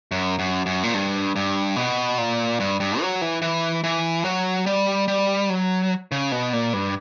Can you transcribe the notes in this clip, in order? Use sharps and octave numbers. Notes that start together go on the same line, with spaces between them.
F#2
F#2
F#2
A#2
G2
G2
B2
A#2
G2
G2
F#3
E3
E3
E3
F#3
G3
G3
F#3
C#3
B2
A#2
G2